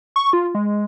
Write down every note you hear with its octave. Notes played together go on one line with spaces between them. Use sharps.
C#6
F4
G#3